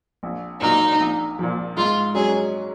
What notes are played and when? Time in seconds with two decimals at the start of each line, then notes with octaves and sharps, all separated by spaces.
0.23 A#1
0.61 A#2 F#3 A#3 D#4
1.00 A#1
1.39 A#2 F3
1.77 G#2 F4
2.15 F#3 C#4 G#4